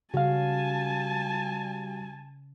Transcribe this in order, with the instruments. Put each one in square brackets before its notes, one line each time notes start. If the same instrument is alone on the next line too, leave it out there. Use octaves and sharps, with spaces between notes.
[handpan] C#3 C#4 [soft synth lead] G3 [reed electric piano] F#4 F5 [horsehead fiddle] G#5 A5